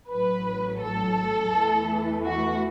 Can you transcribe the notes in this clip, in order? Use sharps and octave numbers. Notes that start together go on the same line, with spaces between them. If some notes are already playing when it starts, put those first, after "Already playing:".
A1 A2 F#3 B4
A4
E2 E3 A3
F#4